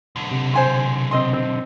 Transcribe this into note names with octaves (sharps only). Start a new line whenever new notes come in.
B1 D3
C3
C5 G#5 C6
C4 D#5 C6
C4